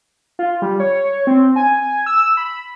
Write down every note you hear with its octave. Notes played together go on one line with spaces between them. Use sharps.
F4
G3
C#5
C4
G#5
E6
B5